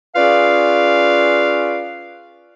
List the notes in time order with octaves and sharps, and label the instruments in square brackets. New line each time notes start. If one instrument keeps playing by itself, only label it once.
[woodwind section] C#4 F4 G#4 B4 D5 F5